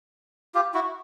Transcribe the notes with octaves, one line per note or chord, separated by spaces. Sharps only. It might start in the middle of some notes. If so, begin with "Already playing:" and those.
F4 G4
E4 F#4